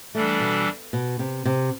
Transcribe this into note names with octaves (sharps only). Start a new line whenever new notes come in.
E3 G3 A3 D4 A4
B2
B2
C3
C3